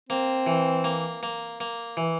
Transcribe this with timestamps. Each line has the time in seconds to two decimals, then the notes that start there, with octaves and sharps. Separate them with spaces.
0.09 A#3 C4
0.47 E3
0.84 A#3
1.23 A#3
1.60 A#3
1.97 E3